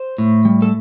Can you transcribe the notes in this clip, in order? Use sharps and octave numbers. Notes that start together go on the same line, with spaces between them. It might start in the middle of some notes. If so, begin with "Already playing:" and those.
Already playing: C5
A2
G3
A4